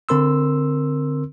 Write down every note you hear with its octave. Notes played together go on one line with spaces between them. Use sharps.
D3 C4 A#4 C6 E6